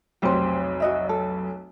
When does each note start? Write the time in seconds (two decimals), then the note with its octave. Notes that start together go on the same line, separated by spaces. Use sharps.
0.22 F1 B1 G4 C5
0.80 F#4 D#5 E5
1.09 A4